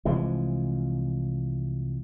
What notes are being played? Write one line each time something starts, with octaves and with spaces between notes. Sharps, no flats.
C2 E3 F3 G#3